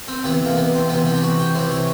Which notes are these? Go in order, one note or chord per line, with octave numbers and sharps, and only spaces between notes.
C4
C3 E3 B3
A#3
B3
C4
C3 E3 B3
C4
G4
F#4
G4
C3 E3 C5
C#5